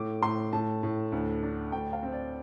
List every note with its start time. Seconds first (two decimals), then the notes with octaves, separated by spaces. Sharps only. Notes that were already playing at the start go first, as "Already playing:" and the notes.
Already playing: A2 D6
0.22 A2 C6
0.53 A2 A5
0.83 A2
1.12 D2
1.43 D4
1.72 D2 G5
1.93 F5
2.03 C4
2.13 D5